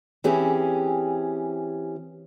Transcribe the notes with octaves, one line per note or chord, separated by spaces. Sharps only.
E3 C4 C#4 G4 G#4